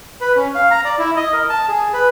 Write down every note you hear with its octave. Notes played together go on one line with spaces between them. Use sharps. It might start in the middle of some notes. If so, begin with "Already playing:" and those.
B4
C#4
F5
A#5
D5
E4
D#5
A#4
A5
G#4
B4